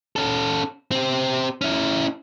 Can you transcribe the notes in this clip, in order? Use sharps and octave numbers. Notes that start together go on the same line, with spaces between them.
C#4 A4
C4 G4
C#4 E4